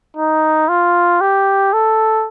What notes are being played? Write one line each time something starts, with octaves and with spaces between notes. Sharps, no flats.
D#4
F4
G4
A4